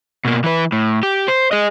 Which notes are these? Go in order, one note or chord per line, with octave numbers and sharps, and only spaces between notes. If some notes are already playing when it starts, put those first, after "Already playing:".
B2 A#3
E3 B4
A2
G4
C5
G#4 D#5